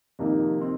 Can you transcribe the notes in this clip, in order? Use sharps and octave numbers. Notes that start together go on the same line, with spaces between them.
F2 C3 D#3 A#3 D#4
C4 D#4